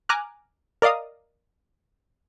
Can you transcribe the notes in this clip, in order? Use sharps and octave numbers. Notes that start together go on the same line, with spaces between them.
G#5 A#5 D6 F6 F#6
A#4 D5 D#5 F5 D#6